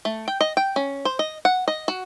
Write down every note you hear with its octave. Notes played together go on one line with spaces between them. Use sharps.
A3
G5
D#5
G5
C#4
C5
D#5
F#5
D#5
F#4